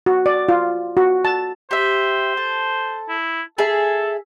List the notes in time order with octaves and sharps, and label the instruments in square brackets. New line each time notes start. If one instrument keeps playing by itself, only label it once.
[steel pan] F#4
D5
F4
F#4
A5
[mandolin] G4 E5 [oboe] C5
[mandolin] A4
[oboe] E4
[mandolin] G#4 E5 [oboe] A4